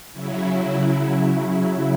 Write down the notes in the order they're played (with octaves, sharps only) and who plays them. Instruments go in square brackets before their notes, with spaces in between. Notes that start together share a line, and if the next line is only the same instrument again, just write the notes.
[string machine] C#3 F#3 E4